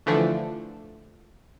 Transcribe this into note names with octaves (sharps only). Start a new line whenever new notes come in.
D3 E3 F3 A3 D4